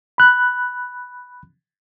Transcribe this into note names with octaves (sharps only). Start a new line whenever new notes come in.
B5 F#6